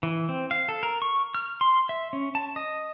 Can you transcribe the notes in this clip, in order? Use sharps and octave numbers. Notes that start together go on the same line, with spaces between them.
E3
C4
F5
A4
A#4
C#6
F6
C6
E5
C#4
A5
D#5